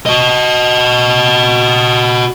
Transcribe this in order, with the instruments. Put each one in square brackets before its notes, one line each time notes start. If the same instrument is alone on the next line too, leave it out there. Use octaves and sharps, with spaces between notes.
[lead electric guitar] F#4 D#5